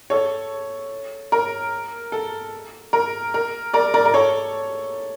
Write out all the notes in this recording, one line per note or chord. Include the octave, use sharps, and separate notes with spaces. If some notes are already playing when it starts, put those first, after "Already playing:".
A4 C#5
A#4
A4
A#4
A#4
A#4 D5
A#4 D5
A#4
A4 C#5